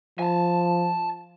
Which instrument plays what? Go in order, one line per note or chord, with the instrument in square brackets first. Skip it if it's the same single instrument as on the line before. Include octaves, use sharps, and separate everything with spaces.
[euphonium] F3 [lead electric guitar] G#5 A5